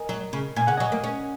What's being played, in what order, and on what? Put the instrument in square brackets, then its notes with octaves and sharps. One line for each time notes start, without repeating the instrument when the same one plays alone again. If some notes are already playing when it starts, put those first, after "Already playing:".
Already playing: [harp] A#4 D#5 G#5
[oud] F#3
C#3
[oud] A#2 [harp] G#5
[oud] C#3 [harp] F#5
[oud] F#3 [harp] D#5 G#5
[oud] A#3
C#4